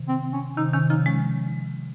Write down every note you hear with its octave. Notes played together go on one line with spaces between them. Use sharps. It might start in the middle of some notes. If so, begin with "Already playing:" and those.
Already playing: C3 D#3
C4
C#4
C3 D#3 D#4
C3 D#3 C#4
C#3 F3 D#4
F3 G#3 C#4